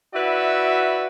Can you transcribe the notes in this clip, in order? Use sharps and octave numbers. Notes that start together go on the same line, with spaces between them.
E4 F#4 B4 D5 E5